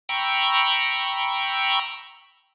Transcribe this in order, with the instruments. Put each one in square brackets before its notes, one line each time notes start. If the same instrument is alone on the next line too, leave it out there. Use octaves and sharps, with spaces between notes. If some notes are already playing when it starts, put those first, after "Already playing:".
[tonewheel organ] G5 A#5 B5 C#6 E6